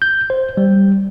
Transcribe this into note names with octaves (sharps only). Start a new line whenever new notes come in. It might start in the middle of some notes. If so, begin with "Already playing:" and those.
G6
C5
G3